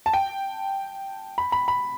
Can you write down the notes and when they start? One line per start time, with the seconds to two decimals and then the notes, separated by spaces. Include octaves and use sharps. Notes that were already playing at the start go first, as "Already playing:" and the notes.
0.06 A5
0.14 G5
1.38 B5
1.52 B5
1.68 B5